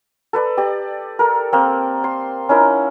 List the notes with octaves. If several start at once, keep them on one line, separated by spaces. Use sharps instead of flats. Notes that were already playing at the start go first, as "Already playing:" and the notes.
A4 B4 D5
G4 D5
A4 A#4
A#3 C4
C6
C#4 D#4 E4 A#4